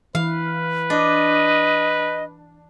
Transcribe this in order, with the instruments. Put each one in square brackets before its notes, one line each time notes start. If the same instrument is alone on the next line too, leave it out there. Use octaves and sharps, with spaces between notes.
[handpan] E3 [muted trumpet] B4 [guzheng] F5
[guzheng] D4 [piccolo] D#5